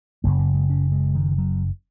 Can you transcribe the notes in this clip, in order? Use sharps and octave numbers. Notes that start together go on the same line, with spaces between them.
F#1 F#2 C#3 A#3
A#3
G#3
C#4
G#3
D#3
F#3